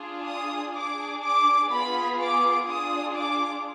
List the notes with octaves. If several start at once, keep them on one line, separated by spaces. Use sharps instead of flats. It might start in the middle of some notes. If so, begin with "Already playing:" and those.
Already playing: D4 F4 G#4
D#6
D4 G#4 D6
D6
B3 F4 G#4 B5
D6
D4 F4 G#4 D#6
D6